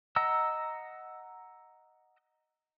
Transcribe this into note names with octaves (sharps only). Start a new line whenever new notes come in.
D#5 F#5 A#5 E6